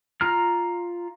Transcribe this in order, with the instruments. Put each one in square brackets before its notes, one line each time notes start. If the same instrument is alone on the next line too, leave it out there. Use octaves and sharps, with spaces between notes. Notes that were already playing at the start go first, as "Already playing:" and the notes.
[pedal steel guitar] F4 A#5 F6